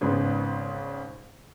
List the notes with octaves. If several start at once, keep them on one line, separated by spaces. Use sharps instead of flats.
G#1 G#2 C#3 B3